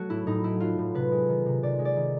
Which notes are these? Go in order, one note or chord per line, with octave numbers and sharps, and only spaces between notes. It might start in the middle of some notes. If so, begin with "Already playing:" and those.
Already playing: F#3 A3 F#4
A2 E4
A2 D#4
A3 E4
F#3 F4
A2
C3 B4
G#3
D#3
C3
C3 D5
G#3
D5
D#3